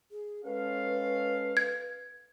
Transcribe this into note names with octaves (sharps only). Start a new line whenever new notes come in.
G#4
G#3 C#4 A4 B4 F5
G#6